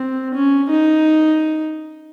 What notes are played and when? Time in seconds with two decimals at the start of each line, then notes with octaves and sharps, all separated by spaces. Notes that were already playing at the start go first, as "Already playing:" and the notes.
Already playing: C4
0.34 C#4
0.70 D#4